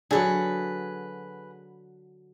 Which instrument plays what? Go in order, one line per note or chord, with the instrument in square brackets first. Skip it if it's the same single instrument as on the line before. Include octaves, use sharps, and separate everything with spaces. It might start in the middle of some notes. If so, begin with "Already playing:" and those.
[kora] D3 F#3 [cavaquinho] G#4 B4